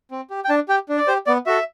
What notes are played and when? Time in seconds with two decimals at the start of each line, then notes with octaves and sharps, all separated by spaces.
0.11 C4
0.30 G4
0.45 G5
0.49 D4 A5
0.69 G4 G5
0.89 D4
0.97 D5
1.08 G4 C5
1.27 B3 D5
1.46 F#4 A4 E5